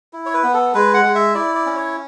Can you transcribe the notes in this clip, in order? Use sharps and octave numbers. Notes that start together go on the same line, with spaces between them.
E4
C#5
B4
B3
A4
G#3 B4
F#5
G#3
E5
E4 D5
D5
C#4
C#5